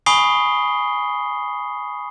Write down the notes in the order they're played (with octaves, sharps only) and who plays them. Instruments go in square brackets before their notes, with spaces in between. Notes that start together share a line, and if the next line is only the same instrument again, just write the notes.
[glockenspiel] G#5 B5 C#6 D#6 C7 G7